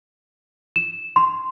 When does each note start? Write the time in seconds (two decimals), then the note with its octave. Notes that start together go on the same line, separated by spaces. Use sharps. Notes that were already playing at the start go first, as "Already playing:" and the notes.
0.76 E7
1.16 C6